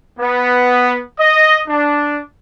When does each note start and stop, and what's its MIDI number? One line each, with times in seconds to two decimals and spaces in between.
0.19 0.99 59
1.18 1.57 75
1.68 2.19 62